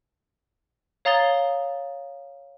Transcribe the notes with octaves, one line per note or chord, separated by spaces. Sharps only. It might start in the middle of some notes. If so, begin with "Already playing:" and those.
C#5 F5 A#5 D#6 A6 G7